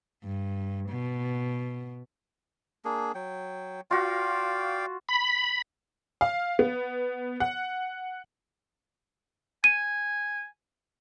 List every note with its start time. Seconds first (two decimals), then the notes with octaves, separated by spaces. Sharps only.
0.24 G2
0.89 B2
2.85 A#3 D4 G#4
3.15 F#3 G5
3.91 F4 F#4 D5 F5 G5
5.09 B5
6.21 F5
6.59 B3
7.40 F#5
9.64 G#5 D#7